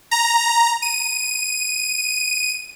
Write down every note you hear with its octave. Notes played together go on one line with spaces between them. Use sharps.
A#5
D#7